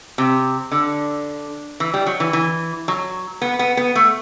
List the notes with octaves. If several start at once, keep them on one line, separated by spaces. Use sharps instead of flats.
C3
D3
E3
G3
F#3
E3
E3
F#3
B3
B3
B3
A3